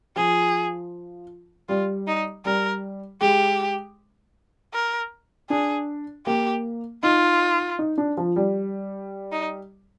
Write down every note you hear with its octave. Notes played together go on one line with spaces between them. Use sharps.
F3 G#4
G3 F4
D#4
G3 A#4
G#3 G4
A#4
D4 G#4
A#3 G4
D#4 F4
D#4
D4
F3
G3
D#4